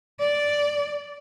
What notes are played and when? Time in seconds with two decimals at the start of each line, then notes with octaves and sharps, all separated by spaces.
0.20 D5